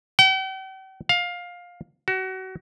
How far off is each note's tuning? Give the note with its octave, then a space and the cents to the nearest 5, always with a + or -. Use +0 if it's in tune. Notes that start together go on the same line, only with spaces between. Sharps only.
G5 -45
F5 +15
F#4 +30